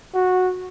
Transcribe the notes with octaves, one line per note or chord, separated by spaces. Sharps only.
F#4